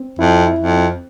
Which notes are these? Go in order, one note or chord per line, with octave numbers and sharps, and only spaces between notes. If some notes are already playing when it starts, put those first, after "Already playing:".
Already playing: C4
F2 E4
E4
F2
C4